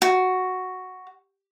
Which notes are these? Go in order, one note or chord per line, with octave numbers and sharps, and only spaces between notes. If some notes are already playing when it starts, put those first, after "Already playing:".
F#4